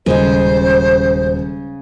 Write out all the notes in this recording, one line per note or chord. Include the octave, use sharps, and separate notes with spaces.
D#1 C#3 G#3 C5